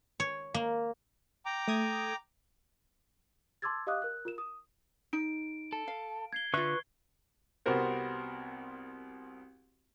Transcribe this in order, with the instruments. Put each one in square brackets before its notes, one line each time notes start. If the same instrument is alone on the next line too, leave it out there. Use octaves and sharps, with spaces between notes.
[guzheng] C#5
A#3
[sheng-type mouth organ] G5 A#5 D6
[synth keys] A3 D#6 G#6
[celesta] A5 C6 D6 E6 G#6 A6
G4 D#5 F5 D6 D#6 F#6
A#4 F#6
F4 A#4 E7
D#6
[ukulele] D#4 [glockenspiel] D7
[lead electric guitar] A4
[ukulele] F5
[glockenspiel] G#6 C7 G7
[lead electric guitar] D3 [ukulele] F4 E5 [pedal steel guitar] B4 C#6 F#6
[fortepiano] C2 B3 C4 F#4 A#4 C5